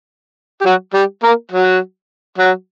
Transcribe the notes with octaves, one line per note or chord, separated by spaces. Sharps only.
G4
F#3 F#4
G3 G4
A#3 A#4
F#3 F#4
F#3 F#4